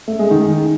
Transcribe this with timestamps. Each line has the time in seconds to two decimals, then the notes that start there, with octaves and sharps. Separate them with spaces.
0.08 A3
0.19 G#3
0.31 D#3